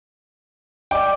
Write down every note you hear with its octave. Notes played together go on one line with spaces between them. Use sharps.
D5 D#5 G5 D6